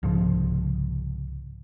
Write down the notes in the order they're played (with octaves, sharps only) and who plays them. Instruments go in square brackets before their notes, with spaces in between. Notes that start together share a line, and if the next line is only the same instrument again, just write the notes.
[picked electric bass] C2 G#2 C#3 F3